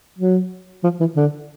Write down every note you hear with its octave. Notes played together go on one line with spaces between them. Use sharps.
F#3
F3
E3
D3